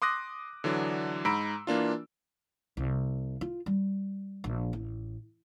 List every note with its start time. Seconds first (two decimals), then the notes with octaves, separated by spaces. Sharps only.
0.02 C6 D6 D#6 F#6 A#6
0.64 D3 E3 F#3 D4
1.25 G#2 A#5 B5 E6 D7
1.67 E3 A#3 D4 F4
2.77 C2
3.41 F4
3.66 G3
4.44 A#1
4.73 A1